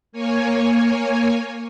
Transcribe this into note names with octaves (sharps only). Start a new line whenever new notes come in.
A#3 C#5 G#5